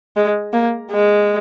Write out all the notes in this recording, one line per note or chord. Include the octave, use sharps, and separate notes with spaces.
G#3
A#3
G#3